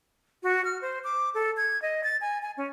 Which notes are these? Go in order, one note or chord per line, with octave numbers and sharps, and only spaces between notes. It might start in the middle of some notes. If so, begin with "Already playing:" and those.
F#4
F6
C5
D6
A4
G#6
D#5
A6
G#5
G#5
C#4